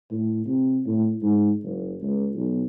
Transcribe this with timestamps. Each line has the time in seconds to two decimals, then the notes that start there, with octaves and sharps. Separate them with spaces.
0.11 A2
0.46 C3
0.86 A2
1.22 G#2
1.63 F#1
2.01 C#2
2.34 B1